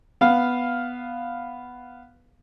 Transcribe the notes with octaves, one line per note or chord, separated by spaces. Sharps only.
B3 F5